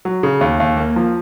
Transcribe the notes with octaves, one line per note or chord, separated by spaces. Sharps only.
F#3
C#3
D#2
D#2
A#3
F3